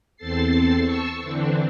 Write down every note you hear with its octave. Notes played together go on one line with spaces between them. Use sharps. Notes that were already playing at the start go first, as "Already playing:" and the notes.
E2 C4 A4 A6 C7
A5 C#6 E6
D3 E3 C4 D4